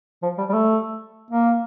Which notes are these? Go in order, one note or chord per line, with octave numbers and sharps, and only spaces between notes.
F3
G3
G3
A3
A#3